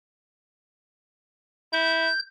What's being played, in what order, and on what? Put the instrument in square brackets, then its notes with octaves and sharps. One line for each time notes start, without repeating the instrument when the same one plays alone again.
[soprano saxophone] E4 [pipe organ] G6